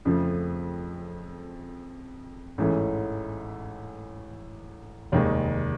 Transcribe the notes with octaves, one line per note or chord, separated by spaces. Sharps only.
F2 C#3 F3 A3 C4
A1 G#2 E3 A3 C#4
F1 D#2 D#3 G#3